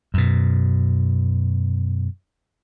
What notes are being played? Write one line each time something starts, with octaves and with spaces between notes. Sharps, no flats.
F#2 B2